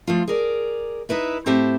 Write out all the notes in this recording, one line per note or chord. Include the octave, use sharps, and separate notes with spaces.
F3 A3 F4
G#4 A#4 D5
D#4 E4 B4 E5
A2 C4 G4 C5 E5 A5